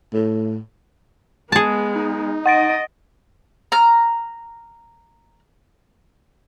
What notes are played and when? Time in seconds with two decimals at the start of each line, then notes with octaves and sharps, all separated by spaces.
0.13 A2
1.52 G#3 B3 G#4 A5
1.96 D#4
2.46 D#5 F#5 A6 D7
3.72 A#5 F6